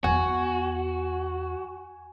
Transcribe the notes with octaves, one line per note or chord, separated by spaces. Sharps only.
E2 B3 F#4 G#5